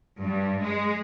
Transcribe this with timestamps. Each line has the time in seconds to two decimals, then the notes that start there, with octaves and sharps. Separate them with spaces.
0.21 G2
0.63 G#3